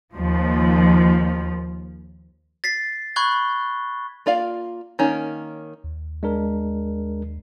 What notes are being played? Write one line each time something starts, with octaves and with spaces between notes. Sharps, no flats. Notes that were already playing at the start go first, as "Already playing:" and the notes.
D#2 F3
A6 B6 C7
B5 C#6 F#6 G#6 G7
A#3 F4 D5 F5
D#3 A#3 C#4
D#2
G#3 D4 A#4